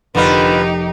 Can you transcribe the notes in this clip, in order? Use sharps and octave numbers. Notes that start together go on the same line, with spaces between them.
F1 D3 D#4 F4 G4 A#4 B4 D7